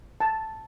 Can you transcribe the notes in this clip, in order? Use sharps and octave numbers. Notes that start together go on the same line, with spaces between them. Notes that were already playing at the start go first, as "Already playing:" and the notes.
A5